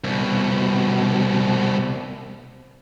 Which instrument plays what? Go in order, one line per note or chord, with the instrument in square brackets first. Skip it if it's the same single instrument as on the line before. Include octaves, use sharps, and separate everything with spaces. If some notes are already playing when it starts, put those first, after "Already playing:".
[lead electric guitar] C2 B2